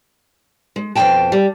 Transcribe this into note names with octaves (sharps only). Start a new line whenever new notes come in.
G#3
F2 B2 A3 C4 G5 A5
G3